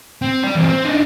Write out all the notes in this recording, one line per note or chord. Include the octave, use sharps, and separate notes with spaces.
C4
G4 D5
E3 C4
C4
D4 D#4